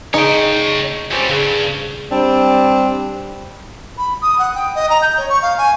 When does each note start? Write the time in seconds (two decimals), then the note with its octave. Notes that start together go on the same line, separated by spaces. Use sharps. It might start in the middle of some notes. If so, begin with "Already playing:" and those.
0.14 C#3 D#4 C#5 G5 C6 C#6
1.11 C#2 G3 C4 C#4 G4
1.29 G2 C#3 C#6
2.10 G3 C4 D4
3.98 B5
4.22 D#6
4.39 F#5
4.55 G5
4.75 D#5
4.90 A#5
5.02 G6
5.18 C#5
5.29 C#6
5.42 F5
5.58 G#5